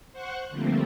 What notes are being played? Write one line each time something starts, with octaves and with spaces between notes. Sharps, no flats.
C5 F#5 C#6 F#6
D3 F3 G3 A3 A#3 C4